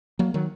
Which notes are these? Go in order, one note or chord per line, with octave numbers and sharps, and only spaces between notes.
F#3 A#3
D#3 F#3